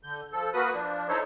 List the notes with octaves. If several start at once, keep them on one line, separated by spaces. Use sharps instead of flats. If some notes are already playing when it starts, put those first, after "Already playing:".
D3 G6
F3 A4
A#3 F#4 B4 B5 D#6
F3 D4
D#4 E4 A4 C5 C#5